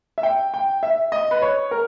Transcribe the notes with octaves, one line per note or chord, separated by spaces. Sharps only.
E5
G5
G5
E5
D#5
B4
C#5
A#4